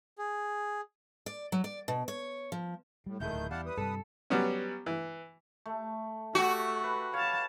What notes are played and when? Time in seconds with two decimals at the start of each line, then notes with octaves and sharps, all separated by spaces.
0.18 G#4
1.26 D5
1.52 F#3
1.64 D5
1.88 B2
2.08 C#5
2.52 F3
3.06 A2 G3
3.20 E1 A#2 D#3 A3 E4 G#4 G6
3.33 D1
3.51 E2 G3 E4 F5 F#5 A5
3.66 B4 D#6
3.77 G2 C3 G3 A4
4.30 F#3 G3 B3 C#4
4.86 E3
5.66 A3
6.35 A3 F#4 G4
6.84 B4
7.14 C#5 F5 A5